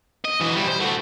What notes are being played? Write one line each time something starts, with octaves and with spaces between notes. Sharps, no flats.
D#5
E3 F#4
G3 E4
C5
A3 F#4